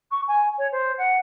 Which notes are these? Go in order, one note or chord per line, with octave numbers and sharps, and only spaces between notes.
C#6
G#5
C#5
C5
F#5